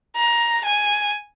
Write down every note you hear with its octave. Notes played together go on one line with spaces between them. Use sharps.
A#5
G#5